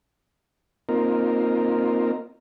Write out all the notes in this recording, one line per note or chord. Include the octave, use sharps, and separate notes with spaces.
A#3 C4 D#4 F4 A#4